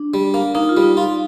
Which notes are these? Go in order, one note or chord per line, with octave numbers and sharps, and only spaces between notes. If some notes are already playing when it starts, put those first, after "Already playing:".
Already playing: D4
G3
A#3
A#3 D#4
F4
G3
D#4
F4